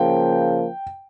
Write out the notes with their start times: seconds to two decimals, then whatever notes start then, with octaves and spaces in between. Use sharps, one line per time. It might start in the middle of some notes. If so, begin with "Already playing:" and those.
Already playing: C#3 F3 A#3 G5